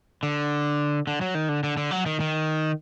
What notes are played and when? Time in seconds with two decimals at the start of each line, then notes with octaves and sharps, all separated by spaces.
0.23 D3
1.07 D3
1.21 F#3
1.35 D#3
1.49 D3
1.63 D3
1.77 D3
1.91 F#3
2.06 D#3
2.20 D#3